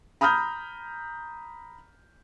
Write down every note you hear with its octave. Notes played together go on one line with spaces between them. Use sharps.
A#5 B5 D#6 F6 G6